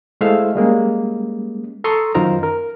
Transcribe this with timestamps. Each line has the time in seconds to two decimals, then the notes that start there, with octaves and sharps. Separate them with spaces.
0.21 G#3 A3 E4 C5 E5 F5
0.55 G3 G#3 A#3 C#4
1.84 A4 A5 A#5 C6 C#6 D#6
2.15 F#2 D#3 F4 A#4 C5 A#5
2.43 A#4